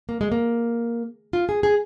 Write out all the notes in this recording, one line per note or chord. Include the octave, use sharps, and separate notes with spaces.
A#3
G#3
A#3
F4
G#4
G#4